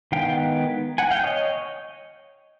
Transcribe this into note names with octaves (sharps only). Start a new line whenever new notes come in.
D#3 G#3 B3 F5 G5
F#5 G#5
F5 G5
C#5 D#5